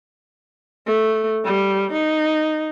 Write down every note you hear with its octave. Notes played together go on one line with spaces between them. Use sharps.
A3
G3
D#4